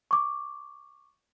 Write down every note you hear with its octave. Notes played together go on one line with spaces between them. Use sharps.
C#6 D6